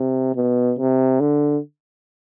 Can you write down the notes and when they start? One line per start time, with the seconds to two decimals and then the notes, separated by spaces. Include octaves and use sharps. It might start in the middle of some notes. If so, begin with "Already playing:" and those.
Already playing: C3
0.36 B2
0.79 C3
1.20 D3